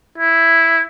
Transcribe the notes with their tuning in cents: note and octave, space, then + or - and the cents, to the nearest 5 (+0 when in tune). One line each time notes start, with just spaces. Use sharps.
E4 +0